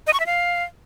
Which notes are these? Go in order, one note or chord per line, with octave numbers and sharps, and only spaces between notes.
D#5
C#6
E5
F5